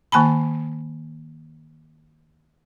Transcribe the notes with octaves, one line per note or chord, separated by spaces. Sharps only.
D#3 A#3 G#5 A5 B5